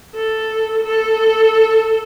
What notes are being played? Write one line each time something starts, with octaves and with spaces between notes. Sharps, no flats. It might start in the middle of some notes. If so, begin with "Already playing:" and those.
A4
A4